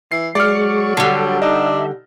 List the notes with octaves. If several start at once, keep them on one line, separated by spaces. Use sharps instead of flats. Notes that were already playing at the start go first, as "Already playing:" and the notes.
E3 C7
F#3 G#3 D5 C#6 F6
D3 G3 A4
D4 D#4 E5